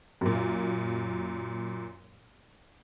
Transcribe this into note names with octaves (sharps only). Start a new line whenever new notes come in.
F#2 A#2